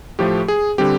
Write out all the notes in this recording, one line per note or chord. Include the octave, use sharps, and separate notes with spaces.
A2 F3 A3 G4
G#4
D3 G3 C4 G4